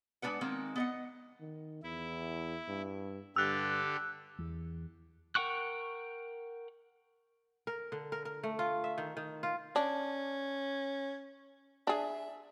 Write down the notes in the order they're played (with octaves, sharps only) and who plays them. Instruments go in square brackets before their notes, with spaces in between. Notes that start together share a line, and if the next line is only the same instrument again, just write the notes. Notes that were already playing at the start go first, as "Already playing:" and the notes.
[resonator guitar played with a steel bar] G#3 A#3 D4 B4 F#5
D#3 G#3 A#3 C4
B3 D#5 F#5
[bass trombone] D#3
[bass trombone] E2 [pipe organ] E4
[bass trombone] G2
[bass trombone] G2 [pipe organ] D3 G4 A4 [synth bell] E6 F#6
[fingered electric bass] E2
[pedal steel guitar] A#4 F#5 G5 C#6 F#6
[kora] A#4
D3
A#4
A#4
A3
F4
E5
D#3
D#3
F4
[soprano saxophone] C#4 [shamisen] D4
[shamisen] D4 G#4 [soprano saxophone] E5